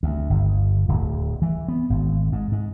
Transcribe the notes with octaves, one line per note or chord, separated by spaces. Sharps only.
D2
G1
D1
E3
B3
G#1
G#2
G#2